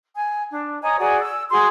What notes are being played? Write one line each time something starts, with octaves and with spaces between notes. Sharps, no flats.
G#5
D4
C#5 D#5 G#5 A#5
F#4 G#4 D5 G#5
E6
F#4 G#4 C6